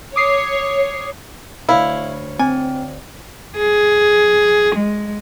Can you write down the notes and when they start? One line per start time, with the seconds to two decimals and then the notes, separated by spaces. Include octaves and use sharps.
0.16 C#5 D6 D#6 C7
1.69 D2 E4 C#5 F5
2.39 C4 G#5
3.58 G#4
4.76 G#3